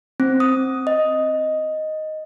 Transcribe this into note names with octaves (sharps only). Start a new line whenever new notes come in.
C4
D#6
D#5